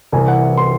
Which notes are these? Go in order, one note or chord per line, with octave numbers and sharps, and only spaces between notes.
C2 C3 E3 G#5
F#5
C6